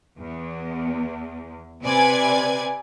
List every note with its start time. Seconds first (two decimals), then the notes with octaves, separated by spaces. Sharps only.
0.19 E2
1.83 C3 B4 D5 G#5 G#6